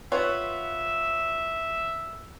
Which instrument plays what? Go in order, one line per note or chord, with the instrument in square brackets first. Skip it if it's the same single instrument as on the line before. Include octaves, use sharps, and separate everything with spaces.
[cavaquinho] F4 B4 F#5 [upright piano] C#5 [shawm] E5